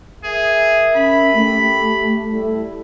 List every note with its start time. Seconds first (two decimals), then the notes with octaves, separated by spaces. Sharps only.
0.24 G#4 A#4 E5
0.95 C#4 B5
1.34 A3 G4
2.31 G3 E4 A4